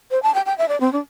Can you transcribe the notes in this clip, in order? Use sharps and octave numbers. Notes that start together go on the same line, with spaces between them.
C5
A5
G5
G5
E5
D5
C4
D4